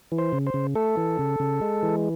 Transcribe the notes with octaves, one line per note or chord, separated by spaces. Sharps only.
E3
C5
C#3
C5
C#3
A3 A4
E3
C#3
C#3
G#3
E3